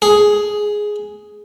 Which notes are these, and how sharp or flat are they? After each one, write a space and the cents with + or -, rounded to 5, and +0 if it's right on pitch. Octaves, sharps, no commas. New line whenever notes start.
G#4 +5